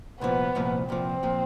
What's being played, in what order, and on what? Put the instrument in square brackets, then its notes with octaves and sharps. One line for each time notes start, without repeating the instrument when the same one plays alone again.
[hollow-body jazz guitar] C2 A#2 F3 [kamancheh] B3
[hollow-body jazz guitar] C2 A#2 F3
[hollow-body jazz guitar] C2 A#2 F3 [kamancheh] C4
[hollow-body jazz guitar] A#2 F3